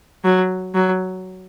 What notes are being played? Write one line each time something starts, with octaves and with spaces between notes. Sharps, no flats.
F#3
F#3